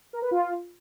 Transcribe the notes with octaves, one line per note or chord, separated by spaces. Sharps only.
A#4
B4
F4